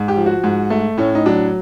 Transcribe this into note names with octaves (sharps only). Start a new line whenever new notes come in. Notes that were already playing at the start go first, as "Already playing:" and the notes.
Already playing: G#2
G4
F3
F#4
G#2
A3
A2 C#4
D#4
F#3 D4